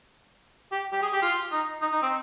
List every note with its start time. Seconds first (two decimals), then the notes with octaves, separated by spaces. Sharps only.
0.72 G4
0.93 G4
1.02 G#4
1.13 G4
1.22 F4
1.52 D#4
1.82 D#4
1.92 D#4
2.02 C4